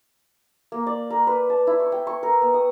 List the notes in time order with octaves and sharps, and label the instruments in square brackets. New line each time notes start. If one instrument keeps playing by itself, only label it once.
[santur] A#3
D5
A#4
B4
A5
E4
C#6
G5
C#6
A#4
B3
D#6